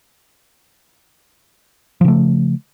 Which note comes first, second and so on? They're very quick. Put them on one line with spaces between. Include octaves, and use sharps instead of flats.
F3 C#3 A3